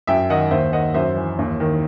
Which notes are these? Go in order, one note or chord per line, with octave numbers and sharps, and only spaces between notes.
F#2 E5 G5
D#3 D#5 F#5
D#2 C5 E5
D#3 D#5 F#5
F#2 C5 E5
E3
D#2
D#3